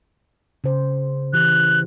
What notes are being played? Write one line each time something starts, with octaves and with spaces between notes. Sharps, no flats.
C#3 C5
E3 G4 F#6